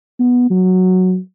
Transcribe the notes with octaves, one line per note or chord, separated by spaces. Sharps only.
B3
F#3